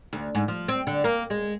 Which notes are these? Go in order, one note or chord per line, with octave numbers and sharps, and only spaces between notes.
D2
G#2
F3
C4
D3
A#3
G#3